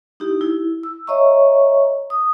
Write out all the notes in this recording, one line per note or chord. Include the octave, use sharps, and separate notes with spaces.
D#4 E4 G4
E4
E6
C#5 D#5 E5 A#5 C#6
D#6